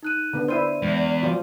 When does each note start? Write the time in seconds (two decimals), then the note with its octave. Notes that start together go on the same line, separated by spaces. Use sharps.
0.03 D#4 F#6 D#7
0.33 D3 B3
0.48 E4 C5 D5 D#7
0.82 E2 G#3
1.23 F3 F#3 F4